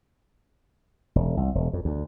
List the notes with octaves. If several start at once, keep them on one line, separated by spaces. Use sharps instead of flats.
E1
C2
E1
F2
D2